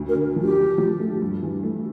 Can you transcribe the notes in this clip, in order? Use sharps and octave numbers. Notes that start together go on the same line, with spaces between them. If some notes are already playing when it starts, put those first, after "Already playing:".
Already playing: D2
A#4
D3
F3
G4
D3
F3
A3
G2
E3
A3